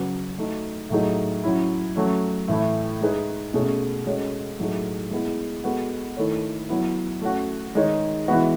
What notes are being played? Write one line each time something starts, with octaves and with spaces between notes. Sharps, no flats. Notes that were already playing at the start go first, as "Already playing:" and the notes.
Already playing: C#3 F#3 C#4 F#4 B4
A3 D#4 F#4
A2 F#3 A3 D#4 G#4
F#3 C#4 E4
F#3 A3 C#4
A2 E3 A3 E4
G#3 D#4 G#4 B4
B2 A3 C#4 G#4
G#3 C#4 F#4 A4 C#5
A2 F#3 A3 D#4 G#4
G#3 B3 E4 G#4
G#3 B3 F#4 A4
D#3 A3 E4 A4 C#5
F#3 B3 E4
A3 C#4 F#4
D#3 G#3 D#4 G#4 C#5
E3 G#3 B3 F#4